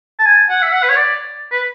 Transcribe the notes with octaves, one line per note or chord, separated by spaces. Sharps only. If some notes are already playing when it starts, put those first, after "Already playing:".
A5
G#5
F#5
E5
F#5
B4
C#5
D5
B4